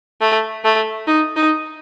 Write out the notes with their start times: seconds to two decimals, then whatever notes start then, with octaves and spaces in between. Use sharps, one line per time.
0.21 A3
0.64 A3
1.07 D#4
1.36 D#4